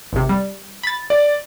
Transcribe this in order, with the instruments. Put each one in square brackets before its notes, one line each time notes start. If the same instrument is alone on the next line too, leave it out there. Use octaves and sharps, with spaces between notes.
[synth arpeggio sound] G#1 C3
G3
B5 A6
[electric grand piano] D5